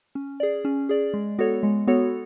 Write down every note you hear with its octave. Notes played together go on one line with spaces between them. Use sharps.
C#4
G#4 D5
C#4
G#4 D5
G#3
B3 F#4 A4 C#5
G#3
B3 F#4 A4 C#5